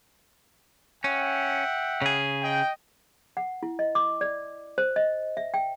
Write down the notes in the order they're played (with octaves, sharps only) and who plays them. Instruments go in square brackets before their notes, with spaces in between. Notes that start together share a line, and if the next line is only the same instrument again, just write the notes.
[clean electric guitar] C#4 [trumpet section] E5 F#5 G5
[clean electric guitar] C#3 G#4
[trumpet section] D#5 G5
[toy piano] F#5
E4
D#5
D6
D5
C5
D#5
E5
G5